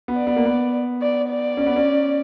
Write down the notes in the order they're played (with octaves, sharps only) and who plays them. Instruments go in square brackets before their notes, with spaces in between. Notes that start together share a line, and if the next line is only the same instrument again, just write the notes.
[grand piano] B3
[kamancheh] D5
[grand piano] B3
A#3
B3
[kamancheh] D5
D5
[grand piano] C#4
B3
C#4